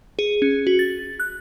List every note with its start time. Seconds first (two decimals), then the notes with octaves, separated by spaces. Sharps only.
0.19 G#4
0.42 C#4
0.67 F#4
0.79 A6
1.20 F#6